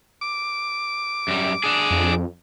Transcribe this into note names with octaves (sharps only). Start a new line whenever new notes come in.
D6
F#2 G3
D4 G#4
F2